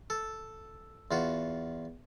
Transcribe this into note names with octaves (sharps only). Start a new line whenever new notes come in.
A4
E2 F4 F#4